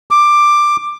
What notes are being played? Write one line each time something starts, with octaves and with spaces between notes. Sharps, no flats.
D6